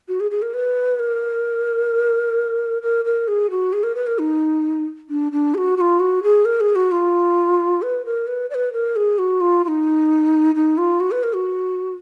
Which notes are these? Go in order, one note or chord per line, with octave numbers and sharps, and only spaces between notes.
F#4
G#4
G#4
A#4
B4
A#4
A#4
A#4
G#4
F#4
G#4
A#4
B4
A#4
D#4
D4
D4
G#4
F#4
F#4
F4
F#4
G#4
A#4
G#4
F#4
F4
B4
A#4
B4
D5
B4
A#4
G#4
F#4
F4
F4
D#4
D#4
F4
F#4
B4
A#4
F#4